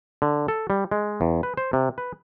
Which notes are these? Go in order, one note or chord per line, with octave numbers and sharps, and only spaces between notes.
D3
A4
G3
G#3
E2
B4
C5
C3
B4